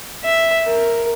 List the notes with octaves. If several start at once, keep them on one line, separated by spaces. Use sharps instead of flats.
E5
A#4